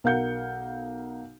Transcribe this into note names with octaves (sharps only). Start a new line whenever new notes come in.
B1 A#4 F5 F#5 G6 C#7